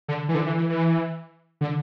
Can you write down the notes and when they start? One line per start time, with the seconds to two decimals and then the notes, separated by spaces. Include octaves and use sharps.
0.08 D3
0.29 E3
0.35 D3
0.46 E3
0.57 E3
0.70 E3
1.61 D3